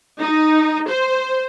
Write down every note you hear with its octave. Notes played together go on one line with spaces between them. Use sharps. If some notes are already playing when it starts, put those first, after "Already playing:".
D#4
C5